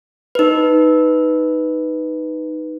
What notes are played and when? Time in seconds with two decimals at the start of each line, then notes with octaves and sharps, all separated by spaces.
0.35 D#4 B4